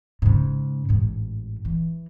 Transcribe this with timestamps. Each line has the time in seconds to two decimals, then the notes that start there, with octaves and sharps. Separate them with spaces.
0.22 G#2 C#3
0.89 A1 G#2
1.65 E3